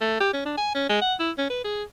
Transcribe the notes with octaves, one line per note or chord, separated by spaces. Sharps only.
A3
G4
C#4
D4
G#5
C#4
G#3
F#5
E4
C#4
B4
G#4